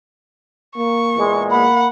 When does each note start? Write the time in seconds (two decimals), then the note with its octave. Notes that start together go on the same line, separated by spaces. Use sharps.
0.76 A#3 C#6
1.17 E2 A#2 G#3
1.51 A#3 F#5 B5